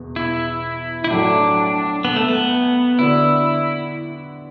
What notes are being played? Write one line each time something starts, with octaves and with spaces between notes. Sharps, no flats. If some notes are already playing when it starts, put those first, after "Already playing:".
Already playing: E2 B2
E4
E4
A2 F#3 A3 D4 F#4
B3
A3
B3
D3 B3 D4 E4 F#4